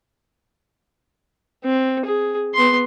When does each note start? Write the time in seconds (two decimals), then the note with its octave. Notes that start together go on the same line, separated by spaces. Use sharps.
1.65 C4
2.05 G#4
2.55 B3 C6